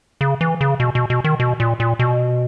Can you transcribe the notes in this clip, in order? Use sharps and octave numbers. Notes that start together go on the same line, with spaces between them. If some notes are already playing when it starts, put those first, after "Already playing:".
C#3
E3
C#3
B2
B2
B2
D#3
B2
A#2
A#2
B2